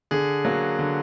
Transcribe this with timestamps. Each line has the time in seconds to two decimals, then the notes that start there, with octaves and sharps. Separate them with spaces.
0.11 D3 G#4
0.45 F#3 A#3
0.79 D3